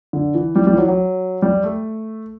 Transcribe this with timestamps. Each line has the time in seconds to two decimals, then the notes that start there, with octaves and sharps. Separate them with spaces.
0.13 D3
0.35 E3
0.56 G3
0.67 G3
0.73 E3
0.78 F#3
0.88 F#3
1.42 G3
1.64 A3